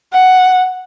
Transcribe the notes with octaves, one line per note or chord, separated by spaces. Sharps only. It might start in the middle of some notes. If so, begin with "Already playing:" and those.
F#5